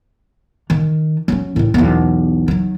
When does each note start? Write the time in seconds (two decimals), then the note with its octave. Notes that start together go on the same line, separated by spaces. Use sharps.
0.70 D#3
1.28 F#3 C#4
1.56 A2 D#3
1.74 B1 E2
2.48 D#3 F#3